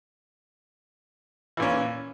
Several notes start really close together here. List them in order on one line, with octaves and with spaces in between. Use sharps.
E3 A#2 C#4